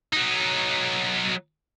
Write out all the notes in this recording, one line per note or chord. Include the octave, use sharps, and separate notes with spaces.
F#3 D#4